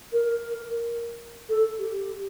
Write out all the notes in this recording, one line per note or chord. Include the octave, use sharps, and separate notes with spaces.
A#4
A4
G4